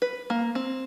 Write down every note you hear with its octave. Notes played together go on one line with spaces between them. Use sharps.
B4
A#3
C4